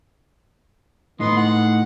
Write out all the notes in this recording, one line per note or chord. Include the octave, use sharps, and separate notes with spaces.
A2 B3 D#4 C6 D#6
F#5